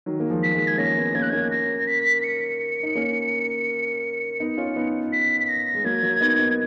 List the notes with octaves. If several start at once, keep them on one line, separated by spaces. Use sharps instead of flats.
D#3 F#3
A#3
F3 G#3
B6
F3 G#3
G#6
A#3 C#4 A#6
B3 D#4
A#3 C#4 G#6
F#6
A#3 C#4 G#6
A#6
B6
C#7
D#4
A#3 C#4
B3 D#4
C#4 F4
B3 D#4
B6
B6
A#6
G#3
F#3 A#3 G#6
F#3 A#3
B3 D#4
B3 D#4